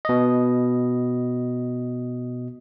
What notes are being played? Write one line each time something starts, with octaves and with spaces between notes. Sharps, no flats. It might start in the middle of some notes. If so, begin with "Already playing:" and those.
B2 D#5